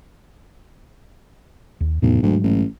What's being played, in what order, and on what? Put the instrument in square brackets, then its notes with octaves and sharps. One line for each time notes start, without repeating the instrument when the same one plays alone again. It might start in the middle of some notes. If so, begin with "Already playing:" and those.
[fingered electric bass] D#2
[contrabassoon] B1 [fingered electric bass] E2 A2 C3
[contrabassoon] D2 [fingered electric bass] G#2 F#3 G#3
[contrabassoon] A1